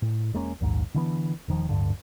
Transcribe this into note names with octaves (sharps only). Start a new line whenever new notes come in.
A2
E1 G#3 A#3 C#4
A#1 D#2 G#2
D3 E3 B3
E1 D#3 F3
D1 G2 D3